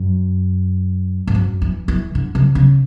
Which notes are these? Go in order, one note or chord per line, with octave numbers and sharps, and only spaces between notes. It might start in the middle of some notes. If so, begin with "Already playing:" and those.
Already playing: F#2
G#2
F#2
E3
E3
D3
C#3
C#3